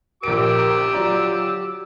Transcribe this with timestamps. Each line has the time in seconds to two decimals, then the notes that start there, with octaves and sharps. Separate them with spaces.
0.23 A#1 G4 A#4 D6 E6 D7
0.93 F#3 F4 D5 A#5